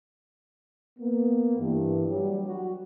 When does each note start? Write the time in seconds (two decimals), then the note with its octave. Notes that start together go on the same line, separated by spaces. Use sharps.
0.99 A#3 B3
1.58 G2 E3
2.06 F#3 G3
2.46 F#4